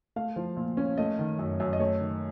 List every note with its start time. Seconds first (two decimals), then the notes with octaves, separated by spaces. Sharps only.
0.16 A3 F5
0.36 F3
0.56 A#2
0.77 C#4
0.98 A3 D#5
1.19 D#3
1.39 F#2
1.60 F#2
1.73 D#5
1.80 A3 C#5
2.01 D#3